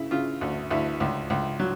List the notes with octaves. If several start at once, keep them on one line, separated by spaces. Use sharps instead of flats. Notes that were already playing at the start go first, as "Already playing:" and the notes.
Already playing: C#3 E4
C#3 F4
D2
D2 E4
C#2
C#2
F#3